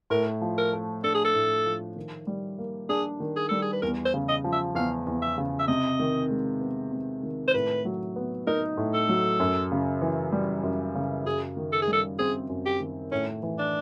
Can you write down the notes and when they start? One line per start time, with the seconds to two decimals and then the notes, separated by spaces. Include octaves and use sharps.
0.10 A2 A#4
0.41 F3
0.58 A#4
0.73 A3
1.03 D4 A4
1.14 G#4
1.25 A4
1.34 A2
1.66 F3
1.96 D#3
2.27 G3
2.58 A#3
2.89 D4 G#4
3.20 D#3
3.36 G#4
3.49 G3 A4
3.62 G#4
3.72 B4
3.82 E2 A#4
4.05 C5
4.14 C#3
4.28 D#5
4.44 F3
4.52 E5
4.75 E2 F5
5.07 E2
5.22 E5
5.38 C#3
5.59 E5
5.68 C3 D#5
5.99 D#3
6.30 G#3
6.61 B3
6.92 C3
7.23 D#3
7.48 C5
7.54 A2 B4
7.85 F#3
8.16 B3
8.47 D#4 A#4
8.77 A2
8.94 A4
9.09 F#3
9.40 F#2
9.72 C#3
10.01 E3
10.32 G3
10.63 F#2
10.95 C#3
11.25 F#2 G#4
11.57 D#3
11.72 A4
11.82 G#4
11.87 G3
11.93 A4
12.19 C4 G#4
12.49 F#2
12.66 G4
12.80 D#3
13.11 A2 C#4
13.43 E3
13.58 D4